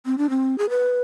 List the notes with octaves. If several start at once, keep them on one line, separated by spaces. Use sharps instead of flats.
C4
D4
C4
G#4
B4